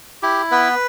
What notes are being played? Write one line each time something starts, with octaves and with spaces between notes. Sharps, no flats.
E4 G4
B3 B4